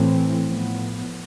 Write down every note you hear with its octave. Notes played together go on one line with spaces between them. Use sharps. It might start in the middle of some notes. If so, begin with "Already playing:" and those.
Already playing: A2 E3 A3 C4
A2 F3 B3